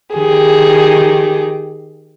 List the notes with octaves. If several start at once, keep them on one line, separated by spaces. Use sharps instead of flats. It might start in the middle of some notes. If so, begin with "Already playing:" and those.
D#3 G4 G#4